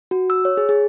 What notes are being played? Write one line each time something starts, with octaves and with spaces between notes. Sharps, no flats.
F#4
E6
C#5
G#4
G#4